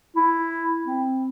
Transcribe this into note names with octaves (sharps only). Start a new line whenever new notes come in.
E4
C4